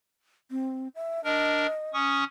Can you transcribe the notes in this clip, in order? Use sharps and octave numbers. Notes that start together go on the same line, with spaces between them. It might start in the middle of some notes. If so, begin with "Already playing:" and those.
C4
E5
D4 A#4 D#5
C#4 C#6 D#6